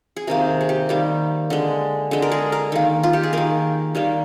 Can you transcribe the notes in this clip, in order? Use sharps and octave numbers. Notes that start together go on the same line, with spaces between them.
G#4
C3 D#3 A#3 A#4
G#4
G4
D#3 G3 A#3
D3 G#3
D3 G#3
A#4
G#4
A#4
D#3 A#3
F4
G4
G#4
D#3 A#3 A#4
D#3 G3 A#3